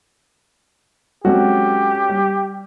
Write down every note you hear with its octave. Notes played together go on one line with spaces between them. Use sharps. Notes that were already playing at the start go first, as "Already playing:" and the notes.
F#3 G#3 C4 C#4 F#4 G4 A4
G3